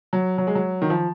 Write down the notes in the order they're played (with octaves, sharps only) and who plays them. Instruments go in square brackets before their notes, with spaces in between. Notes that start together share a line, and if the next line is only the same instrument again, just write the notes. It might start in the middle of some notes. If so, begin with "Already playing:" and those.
[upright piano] F#3
F#3
G#3
F#3
D#3
F3